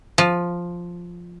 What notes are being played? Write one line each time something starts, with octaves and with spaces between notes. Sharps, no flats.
F3